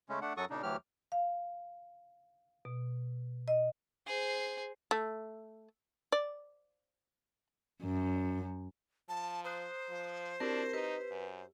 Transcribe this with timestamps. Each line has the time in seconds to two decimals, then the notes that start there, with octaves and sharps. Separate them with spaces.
0.09 C#3 G#3 A3 C#4
0.22 A3 D4 F#5
0.37 F#2 F#3 F#4 A4 C#6 D#6
0.50 A#2 C#3 D4 D#4
0.63 D2 E3 F#3 G4 F6
1.12 F5
2.65 B2
3.48 D#5
4.07 G#4 C5
4.91 A3
6.12 D5
7.83 F#2
9.09 F3 A5
9.44 C5 A#5 D#6 F#6
9.89 F3
10.40 C4 D4 E4 G4 A#4
10.73 D#4 G4 B4
11.11 F#2